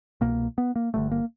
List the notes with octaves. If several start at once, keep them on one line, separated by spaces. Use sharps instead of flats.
C2 B2 A#3
B3
A#3
G1 G2 D3 A3
A#3